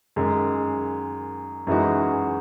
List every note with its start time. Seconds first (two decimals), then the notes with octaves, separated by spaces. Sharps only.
0.16 F#2 D#3 G#3
1.67 F#2 E3 G#3 D#4 F#4